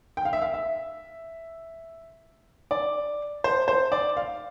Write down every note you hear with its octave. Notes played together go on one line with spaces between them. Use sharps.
G5
F5
E5
F5
E5
D5
C5
C5
D5
F5